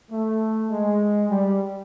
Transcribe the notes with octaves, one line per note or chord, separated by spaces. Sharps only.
A3
G#3
G3